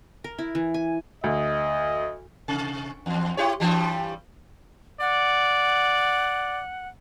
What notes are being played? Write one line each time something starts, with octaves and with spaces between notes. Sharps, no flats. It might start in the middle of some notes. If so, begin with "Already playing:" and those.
A#4
E4
E3
G#5
D2 D#5
C3
E2
E4 G4 C#5
G2 E3 G3
D5 F#5